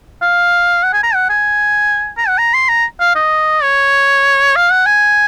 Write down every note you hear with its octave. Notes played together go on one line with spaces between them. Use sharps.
F5
F#5
G#5
A#5
F#5
G#5
A#5
F#5
A#5
C6
A#5
F5
D#5
C#5
F5
F#5
G#5